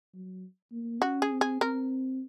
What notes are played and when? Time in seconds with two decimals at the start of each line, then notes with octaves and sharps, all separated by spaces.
0.14 F#3
0.72 A#3
1.02 C#4 F#4
1.22 G#4
1.31 C4
1.41 G#4
1.61 C4 A#4